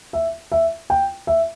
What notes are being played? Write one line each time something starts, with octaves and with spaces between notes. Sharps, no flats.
E5
E5
G5
E5